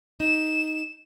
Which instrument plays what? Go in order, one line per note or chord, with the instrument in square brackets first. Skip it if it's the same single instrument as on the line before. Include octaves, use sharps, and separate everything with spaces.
[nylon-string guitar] D#4 [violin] E7